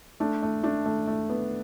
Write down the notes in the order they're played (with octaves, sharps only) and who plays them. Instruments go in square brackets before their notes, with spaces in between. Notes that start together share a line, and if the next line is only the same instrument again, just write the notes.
[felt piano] A3 D4
A3
A3 D4
A3
A3
B3